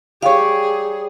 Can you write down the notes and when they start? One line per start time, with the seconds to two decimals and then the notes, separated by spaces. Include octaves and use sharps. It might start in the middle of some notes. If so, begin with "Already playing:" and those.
0.22 G3 G4 G#4 C#5 F5 D6